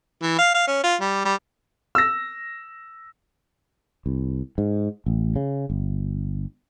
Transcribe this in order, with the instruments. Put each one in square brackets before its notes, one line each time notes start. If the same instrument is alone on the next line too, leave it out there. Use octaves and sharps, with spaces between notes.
[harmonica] E3
F5
F5
C#4
F4
G3
G3
[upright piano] E6 A#6
[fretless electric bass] C2
G#2
A1
C#3
G1